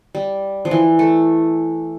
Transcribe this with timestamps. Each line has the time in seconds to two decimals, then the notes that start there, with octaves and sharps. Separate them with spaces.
0.15 G3
0.65 F3
0.71 E3
0.99 A3